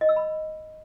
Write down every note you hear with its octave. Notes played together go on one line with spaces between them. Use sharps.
D#5
E6
B5